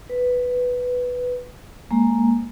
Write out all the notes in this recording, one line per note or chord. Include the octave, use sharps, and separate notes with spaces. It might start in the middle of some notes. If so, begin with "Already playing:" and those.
B4
G#3 A#3